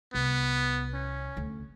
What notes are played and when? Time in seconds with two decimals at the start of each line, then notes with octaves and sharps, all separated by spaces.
0.14 C2 B3
0.94 C#4
1.37 D2